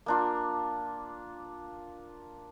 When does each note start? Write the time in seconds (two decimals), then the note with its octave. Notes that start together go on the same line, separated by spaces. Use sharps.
0.06 A#3 D4 F4